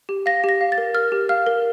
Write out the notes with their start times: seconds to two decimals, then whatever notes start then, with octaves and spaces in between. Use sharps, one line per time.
0.09 G4
0.26 F5 A#6
0.44 G4 A#6
0.61 F5
0.72 A6
0.78 A#4
0.95 A#4 F6
1.12 G4
1.29 F5 F6
1.46 A#4